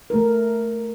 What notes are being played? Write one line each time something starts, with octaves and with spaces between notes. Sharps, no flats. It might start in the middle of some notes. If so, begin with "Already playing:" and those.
A3 A#4